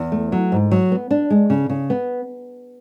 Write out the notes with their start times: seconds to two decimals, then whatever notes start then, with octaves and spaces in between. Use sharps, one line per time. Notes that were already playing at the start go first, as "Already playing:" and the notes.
Already playing: E2
0.12 A3
0.32 F#3
0.52 G#2
0.71 F#3
0.92 B3
1.11 D4
1.30 G#3
1.50 C#3
1.70 C#3
1.90 B3